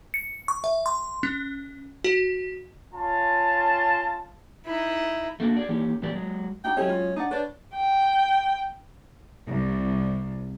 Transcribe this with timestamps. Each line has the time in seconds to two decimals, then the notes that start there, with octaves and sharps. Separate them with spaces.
0.14 C#7
0.48 C#6
0.64 E5
0.86 C6
1.23 C#4
2.04 F#4
2.94 C#4 F4 A5
4.65 D#4 E4
5.40 A3 A#3 D4 F#4
5.57 G#4 D5
5.69 E3 A#3 C#4 D#4 G4
6.02 A2 E3 A#3 G4 D5
6.13 F#3 G#3
6.64 D4 D#4 F#4 G5
6.77 F#3 G#3 C#4 E4 G4 A4 D#5
6.89 F4
7.16 D4 D#4 F#5 D#6 A6
7.31 D4 B4 C#5 G6 A6
7.74 G5
9.46 C2